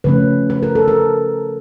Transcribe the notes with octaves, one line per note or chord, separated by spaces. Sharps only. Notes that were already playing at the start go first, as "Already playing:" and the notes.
C#3 F3 A3 C#4 B4
B4
A#4
A4
A#4